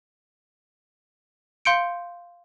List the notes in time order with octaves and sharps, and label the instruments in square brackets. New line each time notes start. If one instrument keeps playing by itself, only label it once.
[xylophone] F5 C6 G6 C#7 D7